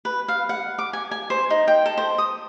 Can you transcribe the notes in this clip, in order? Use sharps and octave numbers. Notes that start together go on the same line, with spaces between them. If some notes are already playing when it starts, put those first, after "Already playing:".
B4
F5
F#5
D6
G#5
G#5
C5
D#4
G5
A4
C5
D#6